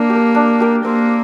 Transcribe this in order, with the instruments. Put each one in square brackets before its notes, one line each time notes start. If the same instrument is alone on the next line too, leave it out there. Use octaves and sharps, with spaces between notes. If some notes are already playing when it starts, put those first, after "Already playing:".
Already playing: [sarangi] A#3 [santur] D4
[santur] G4
A#4
D4
G4 A#4
[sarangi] A#3 [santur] C4